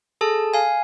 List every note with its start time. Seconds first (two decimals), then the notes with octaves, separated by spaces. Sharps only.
0.21 G#4 A4 A5
0.54 F5 G#5